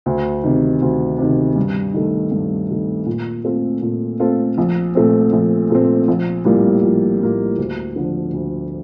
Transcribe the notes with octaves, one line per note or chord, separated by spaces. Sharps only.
D2
C3 D#3
D2
C3 D#3
G2
D#3 A3
G2
D#3 A3
A#2
A3 C4 F4 A4
A#2
A3 C4 F4 A4
A#1
A#2 A3 C4
A#1
A#2 A3 C4
A#1
A2 G3 A#3 F4
A#1
A2 G3 A#3 F4
D2
D3 F3
D2